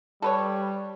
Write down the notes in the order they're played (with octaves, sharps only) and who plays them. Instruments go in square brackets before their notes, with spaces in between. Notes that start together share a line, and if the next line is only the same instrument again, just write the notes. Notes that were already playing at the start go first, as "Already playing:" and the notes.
[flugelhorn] G3 [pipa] A4 B4 C#5